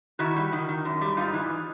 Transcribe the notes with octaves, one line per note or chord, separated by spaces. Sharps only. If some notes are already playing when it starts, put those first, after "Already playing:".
D#3 E4 F#4
G3
D#3
D#3
F#2
G3
G#2 D#4 F4
E3